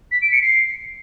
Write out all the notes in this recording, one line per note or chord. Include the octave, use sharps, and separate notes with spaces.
B6
D7
C#7
C7